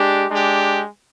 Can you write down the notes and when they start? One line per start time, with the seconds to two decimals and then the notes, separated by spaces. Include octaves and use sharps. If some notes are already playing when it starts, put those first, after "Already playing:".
Already playing: G#3 D4 G4
0.29 G#3 D4 G4